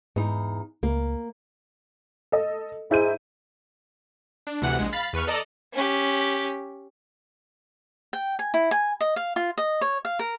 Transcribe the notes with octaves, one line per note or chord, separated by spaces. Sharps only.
E2 G#2 D#4
C#2 A#3
A4 D#5
G#2 E4 G6 D#7
D4
D2 C3 E3 F#5 F#6
A#1 G#3
F5 B5 A6
E2 B4 C#6 F6
A4 D5 D#5 A5 A#5
C#4 G4
G5
G#5
E4
G#5
D#5
F5
F4
D#5
C#5
F5
A#4